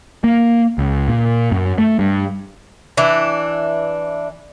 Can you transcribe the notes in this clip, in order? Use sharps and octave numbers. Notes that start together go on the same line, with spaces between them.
A#3
C#2
A#2
F#2
A3
G2
E3 D4